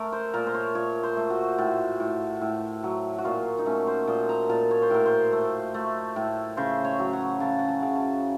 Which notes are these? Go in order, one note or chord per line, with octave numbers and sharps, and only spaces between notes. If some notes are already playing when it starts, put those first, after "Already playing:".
Already playing: A3 A#4
C5
A#2 A#4
C5
C#5
A#2 C#5
C5
A3
F#4
A2
A2
A2
F#3
F#4
A#2 F4
D#4
A3 C#4
C5
A#2 D#5
A#5
A#2 A5
C#5
C5
A2 A#4
C5
A3
A3
A2
C#3 C5
C#5
F#3
F#5
C#3 A5
F#5
A5
C#3
A5